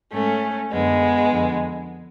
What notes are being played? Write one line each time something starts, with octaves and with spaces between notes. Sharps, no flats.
G#2 A3 C#4
F#2 D3 G#3 B3
F2 D3